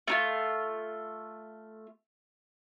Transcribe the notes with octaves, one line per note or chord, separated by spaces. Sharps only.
A3 D#4 F4